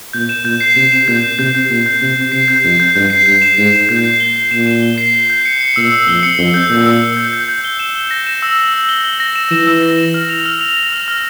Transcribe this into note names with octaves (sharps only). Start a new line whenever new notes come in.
A#2 G6
E7
A#2 G6
C7
C3 E7
E7
A#2 G6
E7
C3 G6
G6
A#2 G6
G6
C3 G6
G6
C3 C7
G6
F2 C7
G6
G2 G6
C7
G2 G6
E7
G#2 C7
E7
A#2 G6
C7
G7
C7
A#2 E7
E7
G7
C7
G7
G6
C#7
C#7
A#2 E6
E6
F2 G7
C#7
F2 G7
G6
A#2 G6
E6
E6
G6
G6
G6
G7
E7
G7
A#6
E7
E6
E6
E6
G7
G7
A#6
E7
E3 E7
E6
A#6
E7
F6
F7
F6
F7
A#6
F6
F6